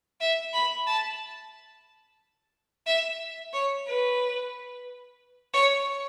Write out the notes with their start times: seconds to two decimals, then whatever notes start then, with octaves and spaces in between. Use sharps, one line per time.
0.21 E5
0.53 B5
0.87 A5
2.87 E5
3.53 C#5
3.87 B4
5.54 C#5